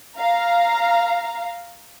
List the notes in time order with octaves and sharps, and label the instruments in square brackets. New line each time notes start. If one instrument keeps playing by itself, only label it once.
[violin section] F5 A#5